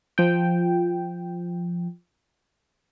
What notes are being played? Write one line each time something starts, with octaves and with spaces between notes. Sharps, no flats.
F3 G5